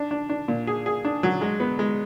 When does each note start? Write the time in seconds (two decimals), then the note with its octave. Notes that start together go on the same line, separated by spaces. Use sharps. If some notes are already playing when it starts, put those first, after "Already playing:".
Already playing: D4
0.11 D4
0.29 D4
0.48 A#2
0.67 G#4
0.86 G#4
1.05 D4
1.23 F#3
1.41 G#3
1.60 B3
1.79 G#3